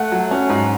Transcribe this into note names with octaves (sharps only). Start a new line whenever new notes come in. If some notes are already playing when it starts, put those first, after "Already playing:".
Already playing: A3 F#5
F#3
C#4
G#2